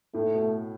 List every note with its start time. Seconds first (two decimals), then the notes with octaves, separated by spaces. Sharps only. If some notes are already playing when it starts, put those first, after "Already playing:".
0.14 A2 A3
0.34 B2